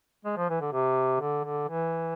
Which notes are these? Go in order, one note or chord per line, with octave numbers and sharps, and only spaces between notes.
G#3
F3
E3
D3
C3
D3
D3
E3